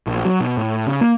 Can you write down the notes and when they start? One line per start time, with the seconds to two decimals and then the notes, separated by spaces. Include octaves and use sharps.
0.07 A#1
0.25 F#3
0.40 B2
0.57 A2
0.86 C#3
1.01 A#3